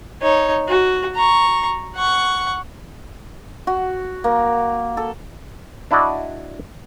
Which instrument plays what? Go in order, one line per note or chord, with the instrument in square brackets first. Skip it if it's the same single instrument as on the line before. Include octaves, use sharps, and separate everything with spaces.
[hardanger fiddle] D#4 C#5
F#4
A#5 C#6
F#5 C#6
[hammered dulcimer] F#4
A#3
A4
[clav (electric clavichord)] D4 E4 F#4 D5 D#5